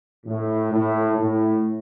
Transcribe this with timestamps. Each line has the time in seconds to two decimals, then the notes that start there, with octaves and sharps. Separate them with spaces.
0.26 A2
0.72 A2
1.18 A2